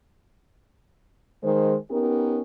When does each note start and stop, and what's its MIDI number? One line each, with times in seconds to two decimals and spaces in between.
1.43 1.76 51
1.43 1.76 56
1.43 1.76 72
1.91 2.42 59
1.91 2.42 61
1.91 2.42 63
1.91 2.42 67
1.91 2.42 70